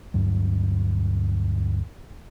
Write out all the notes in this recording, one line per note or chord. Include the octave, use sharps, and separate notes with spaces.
D2 G2 F#3